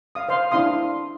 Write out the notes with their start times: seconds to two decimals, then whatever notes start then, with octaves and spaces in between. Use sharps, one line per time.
0.15 F5 D#6
0.28 C5 F5 C6
0.51 D4 E4 F5 C6 D#6